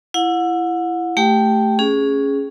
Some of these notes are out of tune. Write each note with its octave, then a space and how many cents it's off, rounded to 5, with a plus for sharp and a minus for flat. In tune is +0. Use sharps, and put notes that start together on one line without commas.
E4 +20 F#5 -30
A3 +0 G4 +0 G5 +0
C#4 +0 G#4 +0